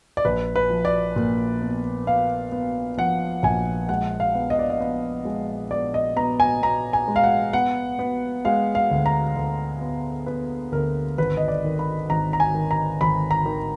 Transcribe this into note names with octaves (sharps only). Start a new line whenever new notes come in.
D5
A#1 B4
B4
F3
D5
A#2
B3
B3 F5
B3
F3 F#5
A#1 G#5
G#3 F#5
F5
B3
D#5
D5
D#5
B3
G#3
B3 D5
D#5
B3 A#5
G#5
B3 A#5
G#5
G#3
F5
F#5
B3 F#5
B3
G#3 F5
F5
D2
A#5
D2
B3
B3 B4
D2 A#4
G#1 B4
D#5
D5
D#3
B5
G#1 A#5
A#5
G#5
D#3
A#5
G#1 B5
A#5
D#3